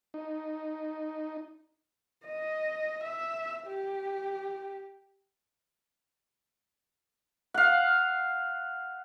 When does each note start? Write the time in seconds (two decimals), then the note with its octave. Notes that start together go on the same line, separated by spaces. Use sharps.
0.14 D#4
2.26 D#5
3.03 E5
3.68 G4
7.54 F5 F#5